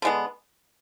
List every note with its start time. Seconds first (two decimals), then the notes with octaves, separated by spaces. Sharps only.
0.02 D3 G#3 B3